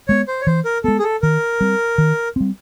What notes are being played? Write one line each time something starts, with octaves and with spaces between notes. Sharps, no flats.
G#3 B3 C#5
C5
C#5
E3 C5
A#4
G#3 B3 A4
G#4
A4
D#3 A#4
G3 C4
D#3
G3 C4